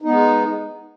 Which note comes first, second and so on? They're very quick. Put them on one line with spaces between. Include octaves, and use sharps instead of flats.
D#4 B3 G#3